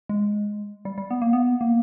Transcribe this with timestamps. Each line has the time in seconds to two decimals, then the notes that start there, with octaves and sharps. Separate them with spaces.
0.09 G#3
0.85 G3
0.98 G3
1.11 B3
1.22 A#3
1.33 B3
1.61 A#3